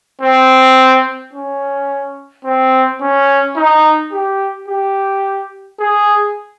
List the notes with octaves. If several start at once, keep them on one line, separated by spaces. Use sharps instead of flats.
C4
C#4
C4
C#4
D#4
G4
G4
G#4